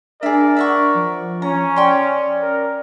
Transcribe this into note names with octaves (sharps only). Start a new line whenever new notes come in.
D4 G#4 A#4 D5 E5
E5 F#5 C#6
F3
C#4 A#5
D5 G5 C6
A#4